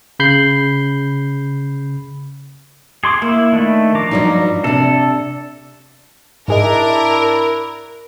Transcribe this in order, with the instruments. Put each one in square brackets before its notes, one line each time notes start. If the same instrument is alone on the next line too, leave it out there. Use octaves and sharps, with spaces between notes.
[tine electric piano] C#3 B5 G6 C7
[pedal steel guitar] G#4 C6 D6
[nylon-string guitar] A#3 [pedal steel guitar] E4
[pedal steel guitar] D#3 A3 D4
F3 A#5 D6
[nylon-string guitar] G2 F#3 D#4
[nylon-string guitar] C3 D4 [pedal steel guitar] A4
[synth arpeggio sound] G#2 G#4 D#5 [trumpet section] D4 E4 [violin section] A#4